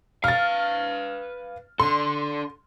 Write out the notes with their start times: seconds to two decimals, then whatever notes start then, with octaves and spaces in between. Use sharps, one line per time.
0.24 B4 F5 F6 A6
1.80 D4 A4 C6